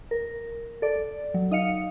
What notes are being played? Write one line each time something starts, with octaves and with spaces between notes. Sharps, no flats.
A#4
A4 D5
F#3
D#4 D#5 F5 C#7